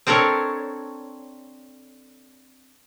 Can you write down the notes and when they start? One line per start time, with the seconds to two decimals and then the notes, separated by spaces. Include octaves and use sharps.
0.07 C4 D4 A4 A#4 C#5